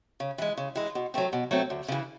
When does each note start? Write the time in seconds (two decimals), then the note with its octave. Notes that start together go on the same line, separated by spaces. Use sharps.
0.20 C#3
0.38 E3 G#3
0.57 C#3
0.75 E3 G#3
0.95 B2
1.14 F#3 A3 C4
1.33 B2
1.51 F#3 A3 C4
1.70 D2
1.88 C#3 E3